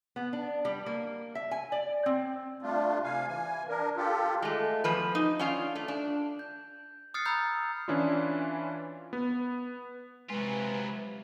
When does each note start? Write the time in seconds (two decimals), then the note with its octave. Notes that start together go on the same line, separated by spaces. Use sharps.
0.16 B3
0.33 D4
0.65 G3
0.86 A#3
1.35 E5
1.51 G#5
1.72 D5
2.06 C4
2.62 G3 A3 D4 F4
3.04 C3 F5 G#5
3.28 E3 G#5
3.68 D4 A#4
3.97 F4 G4 A4
4.42 G#3 A3
4.84 E2 F3 B4
5.15 D#4
5.39 C#4 D4 F4 F5
5.76 A3
5.88 D4
6.39 G6
7.14 D#6 F6 F#6 A6 C7 C#7
7.26 A#5 B5 E6 G6
7.88 E3 C#4 D4 E4 F4
9.13 B3
10.30 C3 F#3 G#3 F4 B4